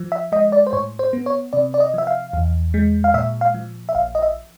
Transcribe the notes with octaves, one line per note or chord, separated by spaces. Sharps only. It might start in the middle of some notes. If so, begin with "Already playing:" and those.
Already playing: F3
E5
G#3 D#5
D5
C5
A2 C#5
C5
B3
C#5
C3 D5
D5
D#5
F3 E5
F5
E2
G#3
F5
A#2 E5
F5
F3
E5
A#1 F5
D#5
E5